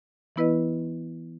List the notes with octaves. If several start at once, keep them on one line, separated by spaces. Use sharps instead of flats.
E3 B3 E4 B4 D#5